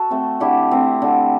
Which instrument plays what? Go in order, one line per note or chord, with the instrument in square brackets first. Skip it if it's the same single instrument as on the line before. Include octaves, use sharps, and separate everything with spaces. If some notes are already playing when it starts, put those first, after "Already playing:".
Already playing: [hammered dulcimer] F#4 A4
A3 C4
D3 E4 G4
A3 C4
D3